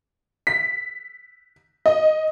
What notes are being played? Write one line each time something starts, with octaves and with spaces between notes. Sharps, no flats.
B6
D#5